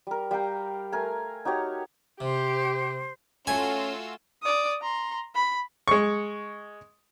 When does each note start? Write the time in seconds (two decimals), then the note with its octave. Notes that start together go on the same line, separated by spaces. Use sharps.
0.07 G3 A#4
0.31 G3 F5 G5 A#5
0.92 A3 A#4 G#5
1.45 D#4 F#4 G4 C#5
2.20 C3 G4 C5
3.47 A3 C#4 F4 F#4 G#5 E6
4.43 D5 D#6
4.82 A#5 C6
5.35 B5
5.88 G#3 C#6